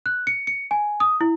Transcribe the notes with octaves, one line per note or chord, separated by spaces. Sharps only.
F#6
C#7
C#7
G#5
D#6
E4